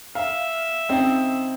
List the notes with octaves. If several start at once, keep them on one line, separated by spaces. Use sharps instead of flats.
E5 F5
C#3 C4 D#4